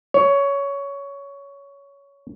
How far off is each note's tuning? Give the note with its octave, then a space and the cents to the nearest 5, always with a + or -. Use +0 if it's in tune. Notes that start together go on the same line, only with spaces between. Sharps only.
C#5 +15